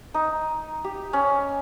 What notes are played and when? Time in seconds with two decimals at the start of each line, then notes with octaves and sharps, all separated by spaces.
0.14 D#4
0.84 G4
1.13 C#4